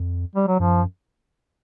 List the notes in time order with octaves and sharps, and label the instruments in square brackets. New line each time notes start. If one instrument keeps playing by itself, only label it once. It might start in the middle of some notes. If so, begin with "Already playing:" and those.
Already playing: [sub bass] F2
[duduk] G3
F#3
[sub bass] F#2 [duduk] F3